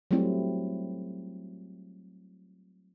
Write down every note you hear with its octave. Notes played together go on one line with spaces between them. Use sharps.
F#3 G3 A3 C4 E4